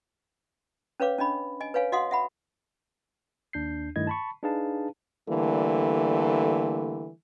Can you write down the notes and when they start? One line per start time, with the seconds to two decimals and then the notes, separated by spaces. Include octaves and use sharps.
1.00 C#4 B4 C#5 F5 D6
1.18 C#4 D4 D#5 B5
1.61 D#5 G#5
1.74 B4 C#5 F5 G#5
1.92 F#4 D#5 F5 F#5 C6 D#6
2.11 E5 F#5 B5
3.53 D#2 D4 G6 C7
3.96 G2 D#3 A3 E4 D#5 G#6
4.07 A5 B5 C#6
4.43 D4 D#4 G#4 B4 F5 A5
5.28 D3 E3 G3 A3 A#3